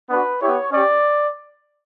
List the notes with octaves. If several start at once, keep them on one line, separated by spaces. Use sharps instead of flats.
B3 D4 F#4 B4
B3 E4 G4 C#5
C#4 G4 D5